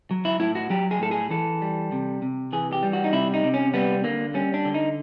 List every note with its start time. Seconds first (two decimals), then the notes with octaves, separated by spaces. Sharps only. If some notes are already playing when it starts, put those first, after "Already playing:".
0.11 F#3
0.25 E4
0.40 A2 E4
0.55 F#4
0.70 F#3 G4
0.91 G#4
1.01 A2 A4
1.11 G#4
1.30 E3 A4
1.62 G3
1.92 C3
2.22 C3
2.53 E3 G#4
2.73 G4
2.83 G3
2.93 F#4
3.04 D#4
3.12 C3 E4
3.34 D#4
3.43 C3
3.54 C#4
3.74 G3 B3
4.04 D3 A#3
4.34 G3 C#4
4.54 D4
4.65 D3
4.74 D#4